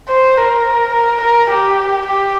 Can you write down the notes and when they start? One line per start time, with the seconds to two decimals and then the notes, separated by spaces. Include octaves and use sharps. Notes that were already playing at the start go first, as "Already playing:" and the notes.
0.08 C5
0.37 A#4
0.94 A#4
1.22 A#4
1.51 G4
2.07 G4